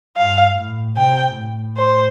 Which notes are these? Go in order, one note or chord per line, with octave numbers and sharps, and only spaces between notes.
G2 F5
A2
C3 G5
A2
C5